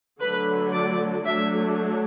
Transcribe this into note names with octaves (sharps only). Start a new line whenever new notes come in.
D3 F#3 A3 B4
D5
F#3 A3 D4 E5